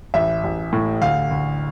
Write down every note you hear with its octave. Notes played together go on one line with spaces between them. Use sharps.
A1 E5
A1
A2
D2 F5
D2